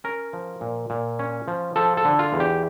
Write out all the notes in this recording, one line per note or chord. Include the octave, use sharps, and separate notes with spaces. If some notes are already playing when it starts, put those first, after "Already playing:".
C#4 A#4
F3
A#2
A#2
C#4
F3
F3 A4
A4
D3
F4
E2
G4